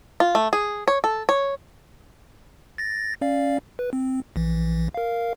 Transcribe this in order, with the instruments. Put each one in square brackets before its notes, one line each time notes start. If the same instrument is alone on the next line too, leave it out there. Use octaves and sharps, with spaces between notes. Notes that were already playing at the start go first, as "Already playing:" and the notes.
[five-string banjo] F4
A3
G#4
C#5
A4
C#5
[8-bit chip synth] A6 A#6
C#4 D5 F5
B4
C4
A#1 E3
A#4 F5